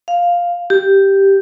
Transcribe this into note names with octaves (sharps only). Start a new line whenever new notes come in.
F5
G4